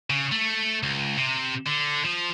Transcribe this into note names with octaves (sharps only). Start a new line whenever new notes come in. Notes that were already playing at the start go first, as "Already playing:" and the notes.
C#3
A3
C#2
C3
D3
F3